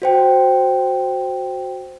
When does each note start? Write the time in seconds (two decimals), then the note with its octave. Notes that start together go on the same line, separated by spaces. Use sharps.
0.02 F#4 C5 G5